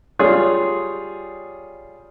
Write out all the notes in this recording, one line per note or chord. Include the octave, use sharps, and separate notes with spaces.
G3 F4 G#4 C#5